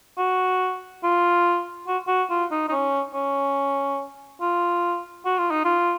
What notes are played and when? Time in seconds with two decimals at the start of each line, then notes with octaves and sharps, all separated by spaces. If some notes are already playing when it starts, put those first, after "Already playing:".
0.18 F#4
1.03 F4
1.88 F#4
2.07 F#4
2.30 F4
2.52 D#4
2.68 D#4
2.72 C#4
3.14 C#4
4.41 F4
5.25 F#4
5.38 F4
5.51 D#4
5.65 F4